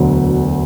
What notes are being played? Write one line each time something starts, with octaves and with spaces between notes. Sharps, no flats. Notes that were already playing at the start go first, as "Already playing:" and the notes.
Already playing: E1 D2 D3 F#3